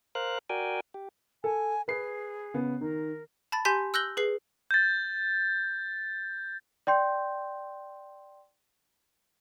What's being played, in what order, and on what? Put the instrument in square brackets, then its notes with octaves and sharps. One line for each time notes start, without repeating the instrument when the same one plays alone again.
[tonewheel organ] A#4 C5 F5 F#6
F#4 A#4 D5 G5 G#5
G4
[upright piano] A4 [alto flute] G#5
[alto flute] G#4 [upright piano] B4 C7
[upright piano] C#3 B3
[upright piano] D#3 [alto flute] A#4
[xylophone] A5 B5 A6
G4 G#5 C6 G6 B6
E6 F#6 G6 A#6 F#7 G7
G#4 B4 C7
[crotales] G6 A6
[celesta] D5 G5 C6 G6